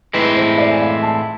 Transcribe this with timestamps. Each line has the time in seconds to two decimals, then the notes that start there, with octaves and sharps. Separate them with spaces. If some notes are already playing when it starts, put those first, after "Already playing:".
0.14 A2 E3 G#3 C4 E4 B4
0.36 C5
0.58 D5
0.71 G#5
0.81 F5
1.03 A5